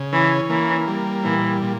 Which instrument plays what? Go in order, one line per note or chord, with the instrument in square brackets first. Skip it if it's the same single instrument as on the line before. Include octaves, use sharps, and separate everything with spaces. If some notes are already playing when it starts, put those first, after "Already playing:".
Already playing: [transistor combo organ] C#3
[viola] E3 [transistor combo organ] C#4
[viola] E3 [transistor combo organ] A#3
[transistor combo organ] G3
[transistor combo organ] A#2 [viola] E3
[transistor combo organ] A#2